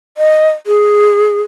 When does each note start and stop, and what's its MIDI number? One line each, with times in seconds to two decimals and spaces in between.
0.18 0.50 75
0.67 1.41 68